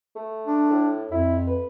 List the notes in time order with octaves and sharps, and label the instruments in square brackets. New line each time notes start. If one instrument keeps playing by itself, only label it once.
[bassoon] A3
[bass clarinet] D4
[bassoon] A2
[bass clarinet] F2 [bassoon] E4
[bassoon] B4